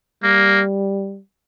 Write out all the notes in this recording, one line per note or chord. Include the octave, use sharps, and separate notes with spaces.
G3 A#3